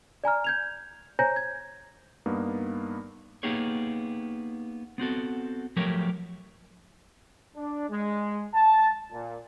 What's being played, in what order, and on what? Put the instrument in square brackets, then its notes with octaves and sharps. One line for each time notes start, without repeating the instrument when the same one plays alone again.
[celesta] D5 G#5 A#5 F6
G6 G#6 F7
C5 C#5 G#5 A#5 G6 A#6
G#6
[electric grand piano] G2 A#3 B3 D#4
[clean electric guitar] A#3 B3 D#4 G4 G#4 C#5
B3 C4 F#4 A4
F3 F#3 A3 G4 A#4 C#5
[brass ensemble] D4
G#3
A5
A#2